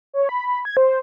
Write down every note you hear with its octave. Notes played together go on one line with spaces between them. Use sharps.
C#5
B5
B5
G#6
C5